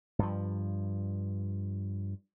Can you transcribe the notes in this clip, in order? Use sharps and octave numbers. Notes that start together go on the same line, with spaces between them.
G2 F3